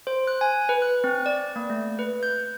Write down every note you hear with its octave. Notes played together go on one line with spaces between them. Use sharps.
C5
F#6
G#5
B4
F#6
C4
D5
A#3
A3
B4
G6